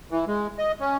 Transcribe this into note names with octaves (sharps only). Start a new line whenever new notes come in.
E3
G#3
D#5
C#4